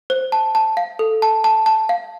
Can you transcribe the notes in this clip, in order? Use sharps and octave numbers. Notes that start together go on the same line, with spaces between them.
C5
A5
A5
F5
A4
A5
A5
A5
F5